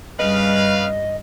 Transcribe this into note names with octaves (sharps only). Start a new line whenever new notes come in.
G2 C#3 G3 B4 D#5 F5